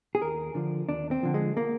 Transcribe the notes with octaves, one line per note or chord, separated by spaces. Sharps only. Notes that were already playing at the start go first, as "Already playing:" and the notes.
G#4
D#2 A#4
D3 F3
D#2 D4
C4
D3 F3
G#3
A#3